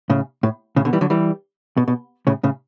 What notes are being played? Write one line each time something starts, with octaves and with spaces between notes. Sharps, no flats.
A2 C#3
A2
A2 C#3
B2 D3
E3 G3
D3 F#3
E3 G3
B2
B2
A2 C#3
A2 C#3